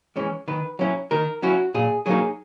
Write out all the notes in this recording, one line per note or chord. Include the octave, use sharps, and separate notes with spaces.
E3 G#3 C#4
D#3 B4
F#3 C#4 E4
D#3 A#4
F#3 C#4 E4 F#4
A#2 G#4
F#3 A#3 D#4 G#4